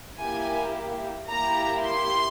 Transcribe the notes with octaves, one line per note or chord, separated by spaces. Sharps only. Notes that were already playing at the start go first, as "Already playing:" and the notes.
A#3 E4 G4 G#5
A#3 E4 G4 A#5
C6